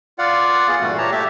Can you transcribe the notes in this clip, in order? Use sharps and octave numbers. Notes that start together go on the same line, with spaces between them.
F4 D5 F5 F#5
B3 G#4
G2 A#2 E3 G3 A3 F#4
A#2 G4 C#5 A5 A#5
A3 G4 E5